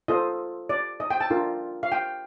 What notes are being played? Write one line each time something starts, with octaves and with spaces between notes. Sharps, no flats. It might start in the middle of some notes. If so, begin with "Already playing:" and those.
F4 A4 C5 D#5
D5
D#5
G5
A5
D4 F4 A#4
F5
G5